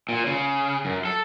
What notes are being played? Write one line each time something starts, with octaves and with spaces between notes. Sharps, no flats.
A#2
C#3
F#2
A4